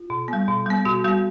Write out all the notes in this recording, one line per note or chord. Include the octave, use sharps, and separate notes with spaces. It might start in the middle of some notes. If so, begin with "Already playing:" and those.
Already playing: F4
B2
G3 B3
B2
G3 B3
B2 F#4
G3 B3 F#4